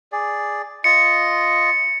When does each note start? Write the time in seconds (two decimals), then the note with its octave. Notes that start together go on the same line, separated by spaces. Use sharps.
0.12 G#4 D5
0.84 F4 D#5 C#7